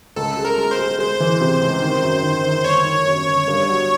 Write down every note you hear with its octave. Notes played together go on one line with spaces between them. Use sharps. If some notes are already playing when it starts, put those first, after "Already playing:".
C#2 A4
G#3
A#4
G#3
C5
G#3
G#3 C5
E3
C3
C#2
D#3
F#2
D#3
D#3
G1 C#5
D#3
F#2
G1
G2
F#3